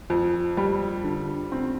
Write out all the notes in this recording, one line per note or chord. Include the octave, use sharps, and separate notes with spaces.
F2
G3
D3
C4